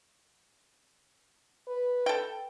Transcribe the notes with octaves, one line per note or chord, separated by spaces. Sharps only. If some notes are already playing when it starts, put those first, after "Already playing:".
B4
A4 G5